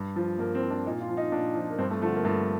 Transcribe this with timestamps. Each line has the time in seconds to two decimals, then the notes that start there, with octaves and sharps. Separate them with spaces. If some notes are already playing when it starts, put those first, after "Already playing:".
Already playing: G2
0.16 F3
0.39 G2 A#3
0.55 C4
0.62 F3
0.70 D4
0.86 A#2 D#4
1.01 F4
1.09 F3
1.17 D#4
1.32 A#2 D4
1.55 F3
1.70 A#3
1.79 G2 C4
1.90 A3
2.02 D3 F3 A3
2.15 A#3
2.25 G2 A3